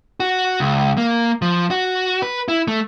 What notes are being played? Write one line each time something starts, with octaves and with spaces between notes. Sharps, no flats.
F#4
C#2
A#3
F3
F#4
B4
E4
A3